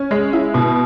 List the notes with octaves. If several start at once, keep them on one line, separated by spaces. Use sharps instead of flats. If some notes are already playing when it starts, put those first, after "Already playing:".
Already playing: C#4
G#3
E4
B2